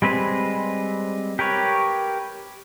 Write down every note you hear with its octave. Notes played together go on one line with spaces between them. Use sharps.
G3 G#3 C4 B4
G4 A#4 B4 C#5